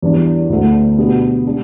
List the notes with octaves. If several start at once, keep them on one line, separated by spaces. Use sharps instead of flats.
E2 E3 G3 D4
D2 D3 A3
B2 B3 D4 G4
G3 D4